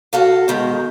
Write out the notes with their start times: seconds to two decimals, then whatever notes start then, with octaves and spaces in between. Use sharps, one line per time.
0.13 F#4 A4 F5
0.48 B2 D#3 G#3